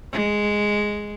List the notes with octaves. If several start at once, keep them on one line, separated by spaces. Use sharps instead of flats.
G#3